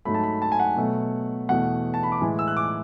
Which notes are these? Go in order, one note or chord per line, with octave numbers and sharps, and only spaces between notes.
G#2 F#3 A3 B5
A5
B5
A5
G#5
F#5
B2 F#3 A3
E2 B2 A3 F#5
A5
B5
D6
A2 E3 G#3
E6
F#6
D6